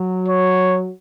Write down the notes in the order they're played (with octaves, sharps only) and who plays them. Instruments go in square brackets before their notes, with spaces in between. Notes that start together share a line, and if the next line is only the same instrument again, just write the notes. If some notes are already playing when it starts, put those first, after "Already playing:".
Already playing: [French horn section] F#3
[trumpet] C#5